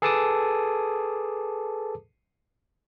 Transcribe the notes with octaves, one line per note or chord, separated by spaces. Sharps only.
G#4 A4 B4 A5 D6 D#6